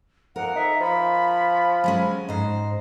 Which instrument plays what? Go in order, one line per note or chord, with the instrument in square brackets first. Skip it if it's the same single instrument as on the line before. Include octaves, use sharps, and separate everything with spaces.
[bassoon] F2 [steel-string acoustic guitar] A#4 [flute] F#5
[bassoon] D#4 [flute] E5
[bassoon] F3 [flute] B5
[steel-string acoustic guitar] F#3 G#3 C#4
[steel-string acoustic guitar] G#2 C5 [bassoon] D#4